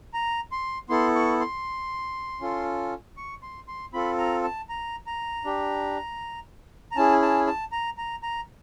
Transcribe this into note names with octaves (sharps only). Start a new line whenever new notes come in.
A#5
C6
B3 E4 A4 C6
C#6
C6
C#4 F4 A4
C#6
C6
C6
C4 F4 A4 B5
A#5
A5
A#5
A#5
D4 G4
A#5
C#4 E4 G#4 A5
A5
A5
A#5
A#5
A#5